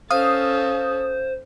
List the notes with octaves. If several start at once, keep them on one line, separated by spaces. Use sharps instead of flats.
C#4 A4 C5 F5 D#6